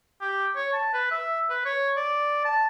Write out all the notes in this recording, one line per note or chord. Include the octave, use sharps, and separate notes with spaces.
G4
C#5
A5
B4
E5
B4
C#5
D5
A5